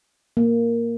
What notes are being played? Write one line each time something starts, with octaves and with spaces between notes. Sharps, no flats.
A#3